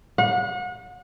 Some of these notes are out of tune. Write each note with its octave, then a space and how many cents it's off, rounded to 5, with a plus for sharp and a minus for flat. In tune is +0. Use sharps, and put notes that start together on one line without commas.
F#5 -35